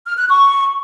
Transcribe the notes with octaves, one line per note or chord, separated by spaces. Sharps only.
F6
F#6
C#6